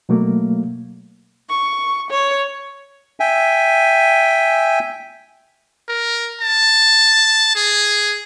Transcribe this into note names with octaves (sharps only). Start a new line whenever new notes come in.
B2 F#3 A3 A#3
C#6
C#5
E5 G5 G#5
A#4
A5
G#4